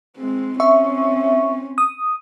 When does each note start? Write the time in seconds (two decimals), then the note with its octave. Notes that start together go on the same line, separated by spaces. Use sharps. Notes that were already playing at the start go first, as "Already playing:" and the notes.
0.18 G#3 C4
0.60 C4 C#4 E5 C#6
1.78 D#6